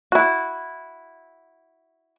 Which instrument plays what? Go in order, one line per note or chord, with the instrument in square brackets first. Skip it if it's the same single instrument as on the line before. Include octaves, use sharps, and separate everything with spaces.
[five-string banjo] E4 F#4